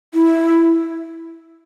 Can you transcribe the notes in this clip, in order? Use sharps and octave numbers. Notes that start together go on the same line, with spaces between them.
E4